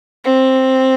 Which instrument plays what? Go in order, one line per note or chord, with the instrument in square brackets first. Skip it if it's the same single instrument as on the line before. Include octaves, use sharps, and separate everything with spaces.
[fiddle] C4